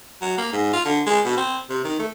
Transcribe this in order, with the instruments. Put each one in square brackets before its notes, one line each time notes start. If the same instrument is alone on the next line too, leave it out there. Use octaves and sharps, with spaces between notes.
[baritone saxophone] F#3
A#3
G#2
F4
D3
G#3
B2
C4
C3
D#3
A3